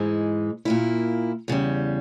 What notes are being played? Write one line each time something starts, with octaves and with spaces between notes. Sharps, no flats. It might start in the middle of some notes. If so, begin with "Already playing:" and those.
Already playing: G#2 E3 G#3
A#2 A#3 E4
E2 C#3 G3